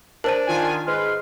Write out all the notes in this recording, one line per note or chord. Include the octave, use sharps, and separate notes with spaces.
D4 A#4 C5 A5
D#3 F4 G#5
G#2 G#3 B4 C6 F6